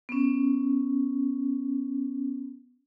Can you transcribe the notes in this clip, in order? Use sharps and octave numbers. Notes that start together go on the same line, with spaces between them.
B3 C#4